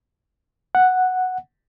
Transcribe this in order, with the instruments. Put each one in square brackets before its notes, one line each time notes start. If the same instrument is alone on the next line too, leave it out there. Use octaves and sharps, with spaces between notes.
[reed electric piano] F#5